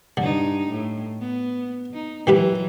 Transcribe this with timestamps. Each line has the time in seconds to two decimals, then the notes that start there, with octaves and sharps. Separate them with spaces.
0.17 G2 D3 D#4
0.71 A2
1.20 B3
1.94 D#4
2.27 D#3 E3 F#3 G4 B4